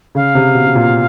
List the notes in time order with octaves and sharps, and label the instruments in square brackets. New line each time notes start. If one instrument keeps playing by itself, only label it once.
[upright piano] C#3 [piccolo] F5
[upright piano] C3
B2
B2
A#2